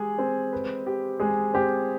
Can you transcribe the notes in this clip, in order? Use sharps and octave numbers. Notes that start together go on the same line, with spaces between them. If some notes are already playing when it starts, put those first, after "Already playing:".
Already playing: G#3 G4 G#4
C4
B4
G4
G#3 G#4
C4 G4